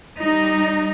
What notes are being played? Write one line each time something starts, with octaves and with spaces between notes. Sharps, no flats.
G3 D#4